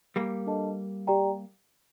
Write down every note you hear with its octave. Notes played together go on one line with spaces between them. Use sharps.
G3 A#3
D4 A4 D#5 A5
G4 D5 G5 A#5